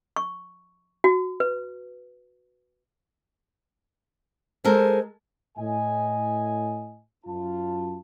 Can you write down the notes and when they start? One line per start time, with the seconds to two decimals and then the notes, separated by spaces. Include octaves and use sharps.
0.16 C#6
1.04 F#4
1.40 B4
4.65 G#3 A4 A#4 C5
5.57 A2 D#5 G#5
7.25 F#2 F4 A5